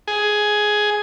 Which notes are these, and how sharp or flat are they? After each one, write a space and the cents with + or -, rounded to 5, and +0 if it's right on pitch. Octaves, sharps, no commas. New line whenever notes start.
G#4 +10